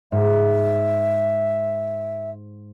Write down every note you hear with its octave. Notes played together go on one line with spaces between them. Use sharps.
G#2 E5